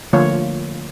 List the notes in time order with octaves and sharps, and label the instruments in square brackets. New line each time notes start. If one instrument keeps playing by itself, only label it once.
[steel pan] D3 F3 A3 A#3 F4 C#5